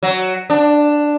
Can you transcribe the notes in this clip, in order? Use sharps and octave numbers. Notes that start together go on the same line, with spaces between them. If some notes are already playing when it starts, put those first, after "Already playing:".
F#3
D4